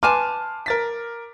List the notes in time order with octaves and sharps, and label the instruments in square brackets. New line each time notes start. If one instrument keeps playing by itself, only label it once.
[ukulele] B4 G#5 A5 [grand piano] C6 D6 F6
[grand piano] A#4 A6 B6